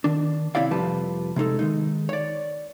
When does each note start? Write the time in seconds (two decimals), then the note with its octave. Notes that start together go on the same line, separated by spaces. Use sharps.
0.04 D#3 D4
0.55 C3 C4 E4 C#5 D5 F5
0.71 C2 F2 F3 G3 B4 A5
1.36 C3 G#3 D#4 A4
1.59 D#3 G#3 D#4
2.09 C#5 D5